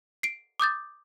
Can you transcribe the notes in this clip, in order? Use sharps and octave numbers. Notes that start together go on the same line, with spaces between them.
C7 D7
D6 D#6 G6 A6